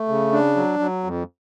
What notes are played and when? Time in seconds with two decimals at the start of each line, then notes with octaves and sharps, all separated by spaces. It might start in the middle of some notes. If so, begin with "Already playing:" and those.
Already playing: A3
0.08 C#3
0.32 D4
0.56 F#3
0.79 F#3
1.04 F2